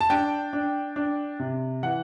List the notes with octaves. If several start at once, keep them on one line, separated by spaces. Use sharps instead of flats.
A5
D4 G5
D4
D4
C3
E3 F#5